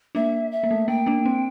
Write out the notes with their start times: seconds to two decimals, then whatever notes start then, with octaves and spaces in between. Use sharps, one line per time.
0.15 A#3 D4 E5
0.52 E5
0.63 A#3
0.71 A3
0.88 A#3 G5
1.06 A#3 D4
1.26 C4